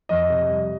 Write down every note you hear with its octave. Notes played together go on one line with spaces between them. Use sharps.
F2 D#5
C3
G3